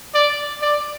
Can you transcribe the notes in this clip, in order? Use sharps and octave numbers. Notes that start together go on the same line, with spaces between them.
D5
D5